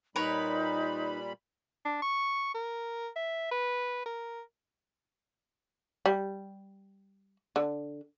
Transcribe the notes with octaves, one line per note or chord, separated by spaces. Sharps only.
A#2 G3 D#4 A#4 B4 C#5 B5
D4
C#6
A#4
E5
B4
A#4
G3
D3